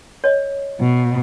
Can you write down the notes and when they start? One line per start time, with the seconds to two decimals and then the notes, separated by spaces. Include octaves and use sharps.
0.24 C#5 D#5
0.81 B2